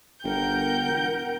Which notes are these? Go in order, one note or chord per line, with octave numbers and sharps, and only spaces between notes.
G1 A#4 F#5 G5 G6
E1